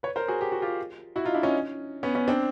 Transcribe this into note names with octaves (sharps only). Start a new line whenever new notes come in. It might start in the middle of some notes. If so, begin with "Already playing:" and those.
B4 C#5
A#4 C5
F#4 G#4
G4
F#4
F4 G4
E4 F#4
D#4 F4
D4 E4
C#4 D#4
B3 C#4
B3 C#4
C4 D4